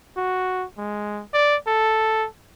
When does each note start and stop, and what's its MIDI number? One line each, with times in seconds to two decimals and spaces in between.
0.17 0.65 66
0.78 1.22 56
1.34 1.56 74
1.67 2.27 69